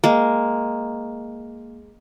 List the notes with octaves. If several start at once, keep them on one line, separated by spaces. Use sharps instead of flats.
G#3 A#3